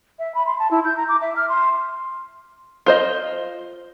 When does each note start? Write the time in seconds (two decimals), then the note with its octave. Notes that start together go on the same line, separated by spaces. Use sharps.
0.19 E5
0.35 B5
0.46 C6
0.59 A5
0.71 E4
0.85 G6
0.97 A#5
1.08 D6
1.21 E5
1.36 F6
1.49 C6
2.86 F4 C5 D#5